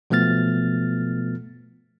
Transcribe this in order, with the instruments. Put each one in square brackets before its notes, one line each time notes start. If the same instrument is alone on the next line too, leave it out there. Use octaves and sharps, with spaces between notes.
[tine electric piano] B2 F3 A3 B3 F6 A6